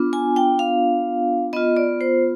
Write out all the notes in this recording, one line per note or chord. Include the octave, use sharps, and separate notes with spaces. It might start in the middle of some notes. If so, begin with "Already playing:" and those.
Already playing: B3 D4 F4
G#5
G5
F5
B3 F4 D#5
D5
C5